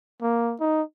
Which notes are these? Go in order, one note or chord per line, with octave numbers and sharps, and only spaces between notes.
A#3
D#4